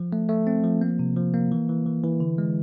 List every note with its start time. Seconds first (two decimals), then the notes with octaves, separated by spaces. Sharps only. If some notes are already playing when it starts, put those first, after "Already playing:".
Already playing: F3
0.13 A3
0.29 A3
0.47 C4
0.64 F3
0.81 A#3
0.99 C3
1.17 F3
1.34 A#3
1.52 E3
1.69 E3
1.86 E3
2.04 E3
2.20 D3
2.38 G#3